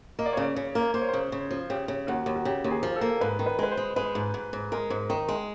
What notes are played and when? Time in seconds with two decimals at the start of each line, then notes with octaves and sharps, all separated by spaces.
0.19 A#3 D#5
0.26 D5
0.33 C#5
0.37 C#3 D5
0.56 C#3
0.75 A#3
0.94 A#3 C5
1.01 C#5
1.08 C5
1.13 C#3
1.32 C#3
1.51 F3
1.70 C#3 G4
1.88 C#3
2.07 D#2 F#4
2.26 D#2
2.36 F#4
2.45 C#3 G4
2.64 D#2
2.71 G#4
2.83 F3
2.96 A4
3.01 A#3
3.21 G#2 B4
3.39 D#3
3.46 B4
3.59 G#3 B4
3.71 C5
3.77 G#3
3.96 G#3 B4
4.15 G#2
4.34 G#2
4.53 G#2
4.72 G#3 A#4
4.90 G#2
5.10 D#3
5.29 G#3